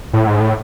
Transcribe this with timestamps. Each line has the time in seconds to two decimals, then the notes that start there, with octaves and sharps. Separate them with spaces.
0.13 A2
0.27 G#2
0.40 A2